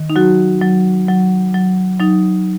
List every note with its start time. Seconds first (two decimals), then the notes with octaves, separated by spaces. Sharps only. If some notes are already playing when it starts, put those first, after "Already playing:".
Already playing: D#3
0.10 D#4
0.16 F#3 F#4
0.62 F#3
1.08 F#3
1.54 F#3
1.99 F#3 D#4